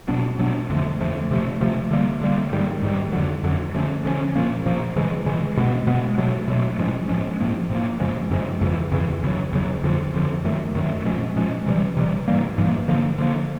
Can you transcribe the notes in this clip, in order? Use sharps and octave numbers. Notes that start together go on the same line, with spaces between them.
B2 F#3 B3 D4
B2 F#3 B3 D4
F2 D3 F3 A3
F2 D3 F3 A3
C3 F3 A3
C3 F3 A3
D3 G3 A#3
D3 G3 A#3
G#2 D#3 G3
G#2 D#3 G3
F2 D3 F#3
F2 D3 F#3
D3 F3 A3 C#4
D3 F3 A3 C#4
A#2 F3 A#3
A#2 F3 A#3
C#3 E3 G#3
C#3 E3 G#3
B2 G#3 B3
B2 G#3 B3
B2 F#3 A3
B2 F#3 A3
A2 F3 G#3 C#4
A2 F3 G#3 C#4
A2 F3 A#3
A2 F3 A#3
F#2 C#3 F3 G#3
F#2 C#3 F3 G#3
F2 C#3 E3
F2 C#3 E3
E2 C#3 F#3
E2 C#3 F#3
F2 D3 F3
F2 D3 F3
F#2 D#3 F#3 A3
F#2 D#3 F#3 A3
A#2 F3 G#3 C#4
A#2 F3 G#3 C#4
C3 E3 G3
C3 E3 G3
G#2 E3 G3 A#3
G#2 E3 G3 A#3
D3 F3 A#3
D3 F3 A#3